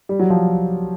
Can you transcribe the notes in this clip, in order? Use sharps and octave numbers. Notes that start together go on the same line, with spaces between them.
G3
F#3
F3